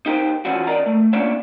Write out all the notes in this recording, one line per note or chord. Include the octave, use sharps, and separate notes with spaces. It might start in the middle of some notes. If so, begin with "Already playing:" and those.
D#4 G4 A#4 C5
E3 F3 C#4 E4 F#4
A#4 D5 D#5 A#5
A3
A#3 C#4 D4 F4 C#5 E5